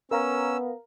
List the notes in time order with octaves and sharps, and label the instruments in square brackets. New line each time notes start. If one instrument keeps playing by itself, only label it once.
[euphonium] B3 [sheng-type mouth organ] C#4 E6 [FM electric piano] A#4 F5 A#5